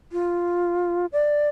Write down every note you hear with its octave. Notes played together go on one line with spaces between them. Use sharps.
F4
D5